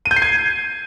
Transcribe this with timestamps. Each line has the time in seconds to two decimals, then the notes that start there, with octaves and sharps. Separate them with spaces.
0.06 D#7
0.11 G6
0.16 C7
0.22 G#6